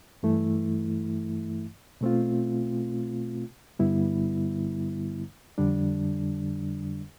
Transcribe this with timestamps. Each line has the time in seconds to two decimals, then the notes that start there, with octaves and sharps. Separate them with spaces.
0.23 G2 E3 A3 E4
2.01 B2 A3 C4 F4
3.79 G2 D3 G3 B3 E4
5.58 F2 D3 G3 D4